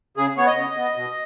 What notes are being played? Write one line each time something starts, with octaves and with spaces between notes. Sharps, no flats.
C#3 G#4
B3 C#5
D#5
C#3
B3
B2